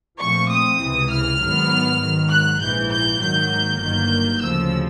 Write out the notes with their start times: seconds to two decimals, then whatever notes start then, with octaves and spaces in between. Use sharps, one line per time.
0.20 A#2 F3 A3 C4 C#6
0.50 D#6
0.80 C#2 C3 E3
1.11 F6
1.41 G#2 D#3 F#3 B3
2.01 G#2 D#3 F#3
2.31 F#6
2.61 A#1 G#2 E3 G6
2.90 G6
3.21 G#2 D#3 F#3 A#3 G6
3.80 G1 G2 D#3 F#3 A#3 G6
4.42 D2 C#3 F3 E6